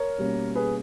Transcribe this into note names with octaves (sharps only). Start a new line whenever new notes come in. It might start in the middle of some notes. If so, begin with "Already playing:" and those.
Already playing: A#4 C#5
B2 G3 A#3 C#4
G#4 B4